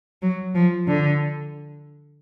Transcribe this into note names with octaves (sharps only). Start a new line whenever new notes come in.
F#3
F3
D3